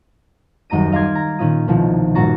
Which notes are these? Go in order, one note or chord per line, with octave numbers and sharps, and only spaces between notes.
D#1 F#2 D#4 A#5 A#6 D#7
D#5 F5 A#5 C6 D6 G#6
A#5
A#2 D#3 C#4 F4 D#6
C2 B2 D#3 F3
G1 A#2 F#4 A#5 C#6 A6